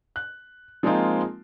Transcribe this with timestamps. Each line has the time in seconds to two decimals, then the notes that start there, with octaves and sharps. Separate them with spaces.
0.16 F#6
0.83 F3 G#3 A#3 C4 D#4 F4